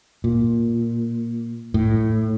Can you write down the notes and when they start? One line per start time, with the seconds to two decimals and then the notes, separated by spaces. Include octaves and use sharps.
0.24 A#2
1.74 A2